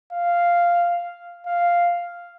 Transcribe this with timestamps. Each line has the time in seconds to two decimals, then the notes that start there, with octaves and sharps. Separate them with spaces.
0.13 F5
1.46 F5